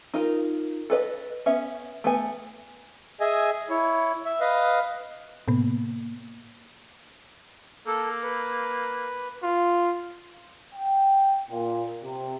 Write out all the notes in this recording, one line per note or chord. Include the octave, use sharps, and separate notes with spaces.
D#4 F4 A#4
A4 B4 D5 D#5
B3 C#4 E5
A3 B3 G#5
G#4 D#5 E5 G#5
E4 C#5
E5
B4 D#5 F5
A2 C3 A#3 B3
A#3 A4
B4
F4
G5
A#2
C3